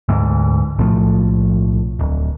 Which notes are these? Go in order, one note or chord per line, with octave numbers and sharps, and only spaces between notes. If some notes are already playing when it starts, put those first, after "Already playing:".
D2 G#2
B1 A2 F3 A3
D1